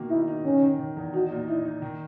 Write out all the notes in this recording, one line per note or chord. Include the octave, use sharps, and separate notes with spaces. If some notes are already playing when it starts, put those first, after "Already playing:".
Already playing: B2 D#3 A#3
D#4 E4
D#4
D#3 C#4
D#3
D#3
E2
D#4 F#4
A#2
D#4 E4
D#4
D#3